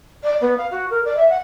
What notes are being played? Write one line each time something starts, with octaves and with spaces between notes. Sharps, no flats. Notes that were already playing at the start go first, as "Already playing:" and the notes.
D5
B3
F5
F#4
A#4
D5
E5
F#5